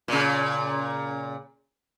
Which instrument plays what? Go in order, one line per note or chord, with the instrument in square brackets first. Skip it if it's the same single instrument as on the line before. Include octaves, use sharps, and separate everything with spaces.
[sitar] A#2 C#3